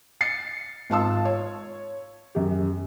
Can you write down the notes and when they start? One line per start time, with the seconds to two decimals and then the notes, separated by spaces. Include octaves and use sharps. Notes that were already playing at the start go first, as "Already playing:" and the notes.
0.21 A6 C7 C#7
0.90 G#1 F4 A5 E6
1.25 C#5
2.35 F#2 G4